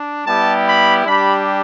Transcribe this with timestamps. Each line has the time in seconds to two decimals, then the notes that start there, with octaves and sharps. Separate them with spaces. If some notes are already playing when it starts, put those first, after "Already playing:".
Already playing: D4
0.25 G3 B3 E4 G4 A5
0.66 B5
1.05 G3 D4 G4 B5